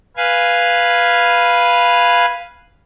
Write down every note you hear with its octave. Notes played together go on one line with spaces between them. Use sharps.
B4 F5 G#5